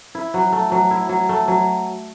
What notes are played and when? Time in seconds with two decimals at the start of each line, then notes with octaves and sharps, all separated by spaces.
0.15 E4
0.34 F#3
0.52 A3
0.72 F#3
0.91 E4
1.09 F#3
1.29 A3
1.48 F#3